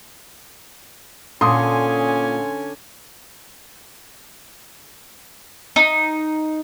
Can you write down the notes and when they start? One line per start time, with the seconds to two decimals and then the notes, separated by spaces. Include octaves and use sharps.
1.41 A#2 D3 C#4 G#5 C6 D#6
5.76 D#4